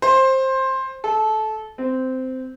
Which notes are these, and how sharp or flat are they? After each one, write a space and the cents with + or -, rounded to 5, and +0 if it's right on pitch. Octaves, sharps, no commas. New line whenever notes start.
C5 +15
A4 -20
C4 -15